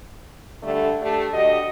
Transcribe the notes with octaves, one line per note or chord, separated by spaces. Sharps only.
D3 G3 A3
A3 D4 G4
D2 F#4 G4 D#5